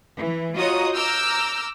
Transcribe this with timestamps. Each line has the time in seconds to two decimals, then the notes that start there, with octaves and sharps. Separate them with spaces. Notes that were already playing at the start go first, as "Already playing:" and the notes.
0.18 E3
0.58 F4 F#4 C#5 D#5 A#5 D#6
0.93 A#5 D6 E6 F6 G6